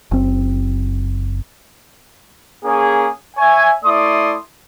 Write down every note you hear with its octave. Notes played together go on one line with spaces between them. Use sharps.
F#1 C4
A#3 C#4 G#4
C#5 E5 G#5
A3 E4 D5 C6 D#6